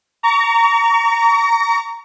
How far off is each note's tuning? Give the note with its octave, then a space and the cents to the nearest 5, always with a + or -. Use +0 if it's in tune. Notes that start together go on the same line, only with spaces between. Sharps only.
A#5 -15 C#6 +40